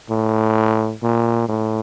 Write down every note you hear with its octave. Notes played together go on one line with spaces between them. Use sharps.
A2
A#2
A2